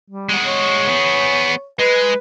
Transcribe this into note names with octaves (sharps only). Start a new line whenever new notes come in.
G3
G#3 F#4
C#5
B3 G#4
G#3 B4